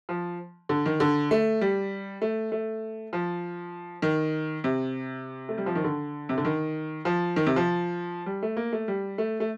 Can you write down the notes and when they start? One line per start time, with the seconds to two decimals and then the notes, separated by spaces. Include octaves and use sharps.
0.09 F3
0.69 D3
0.86 D#3
1.00 D3
1.31 A3
1.61 G3
2.22 A3
2.52 A3
3.13 F3
4.02 D#3
4.64 C3
5.49 A3
5.58 G3
5.66 F3
5.75 D#3
5.84 D3
6.29 C3
6.38 D3
6.45 D#3
7.05 F3
7.36 D#3
7.47 C3
7.56 F3
8.26 G3
8.42 A3
8.57 A#3
8.73 A3
8.88 G3
9.18 A3
9.40 A3